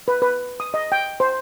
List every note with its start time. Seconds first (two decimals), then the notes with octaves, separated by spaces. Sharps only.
0.08 B4
0.22 B4
0.60 D#6
0.74 D#5
0.92 G5
1.20 C5